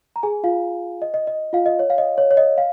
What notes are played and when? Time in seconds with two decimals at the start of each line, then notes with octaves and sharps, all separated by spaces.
0.16 A#5
0.23 G#4 G#5
0.44 F4 F5
1.02 D#5
1.14 D#5
1.27 D#5
1.53 F4 F5
1.66 D#5
1.79 C#5
1.90 F5
1.98 D#5
2.18 C#5
2.31 C#5
2.37 D#5
2.58 F5